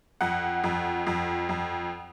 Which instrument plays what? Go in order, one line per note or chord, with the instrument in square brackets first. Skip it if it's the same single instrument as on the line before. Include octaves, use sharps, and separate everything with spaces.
[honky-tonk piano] F2 F#5
F2
F2
F2